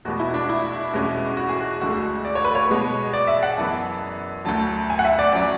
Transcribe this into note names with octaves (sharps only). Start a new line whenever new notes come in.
E2 B2 G#3 B3 F#4
E4
D4
E4
E2 B2 G#3 C#4
F#4
G#4
F#4
D2 D3 G#3 F#4
D5
C#5
B4
C#5
B2 G#3 B3
D5
E5
F#5
F#2 E3 B3 A5
D2 D3 F#3 A5
G#5
F#5
E5
D5
F#3 C#4 D5